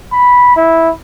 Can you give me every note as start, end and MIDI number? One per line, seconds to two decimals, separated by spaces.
0.12 0.52 83
0.57 0.90 64